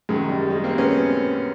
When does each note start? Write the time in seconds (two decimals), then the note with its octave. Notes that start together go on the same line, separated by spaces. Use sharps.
0.09 F#2 D#3 G#3
0.29 G3
0.50 G#3
0.64 A#3 C4
0.78 B3 C#4